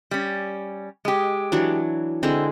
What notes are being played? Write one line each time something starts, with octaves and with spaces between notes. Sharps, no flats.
G3 C#4
G#3 G4
E3 F#3 D4
D3 G#3 C4 E4